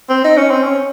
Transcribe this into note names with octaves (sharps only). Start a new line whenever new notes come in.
C4
D#4
C#4
C4
C#4